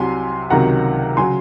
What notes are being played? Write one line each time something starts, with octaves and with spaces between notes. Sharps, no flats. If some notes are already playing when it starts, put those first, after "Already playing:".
Already playing: C2 C3 F#3 G#5 C6
C#2 C3 D#3 F#3 F#5 A#5
C#3 F#3 G#5 C6